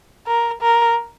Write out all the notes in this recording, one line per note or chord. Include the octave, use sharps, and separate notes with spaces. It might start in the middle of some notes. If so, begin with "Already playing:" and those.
A#4
A#4